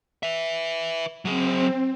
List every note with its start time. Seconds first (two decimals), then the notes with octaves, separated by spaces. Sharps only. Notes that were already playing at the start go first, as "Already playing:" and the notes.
0.23 B4 E5
1.25 F#3 C4 G#4